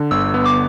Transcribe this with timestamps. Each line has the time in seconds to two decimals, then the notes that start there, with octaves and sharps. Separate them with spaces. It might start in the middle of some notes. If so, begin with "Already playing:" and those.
Already playing: D3
0.11 G1 E6
0.34 B3
0.46 D6